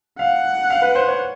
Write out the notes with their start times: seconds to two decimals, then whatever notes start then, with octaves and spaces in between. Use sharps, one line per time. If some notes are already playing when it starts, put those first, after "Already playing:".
0.19 F5 F#5
0.70 F5
0.82 B4
0.95 C5
1.07 C#5